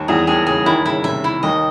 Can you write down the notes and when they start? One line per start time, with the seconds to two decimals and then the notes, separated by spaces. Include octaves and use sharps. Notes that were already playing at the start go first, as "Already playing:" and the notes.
Already playing: D#2 D#3
0.08 E2 E3 G#4
0.27 D#2 D#3 G#4
0.47 C#3 G#4
0.66 D#2 D#3 E4
0.85 C#3 E4
1.04 C3 E5
1.24 E4
1.43 D#2 D#3 D#5